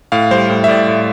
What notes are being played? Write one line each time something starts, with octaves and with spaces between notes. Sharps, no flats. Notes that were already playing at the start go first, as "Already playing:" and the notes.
A2 F5
G3 C5
A2
E5
A2 D5
A2